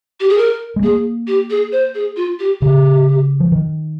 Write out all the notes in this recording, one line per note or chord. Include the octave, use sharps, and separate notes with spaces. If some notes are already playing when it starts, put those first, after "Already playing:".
G4
G#4
A#4
G#3
A#3 G#4
G4
G#4
C5
G#4
F4
G4
C#3 G4
F3
D#3